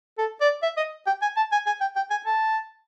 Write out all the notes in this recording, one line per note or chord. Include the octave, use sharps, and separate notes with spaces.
A4
D5
E5
D#5
G5
G#5
A5
G#5
G#5
G5
G5
G#5
A5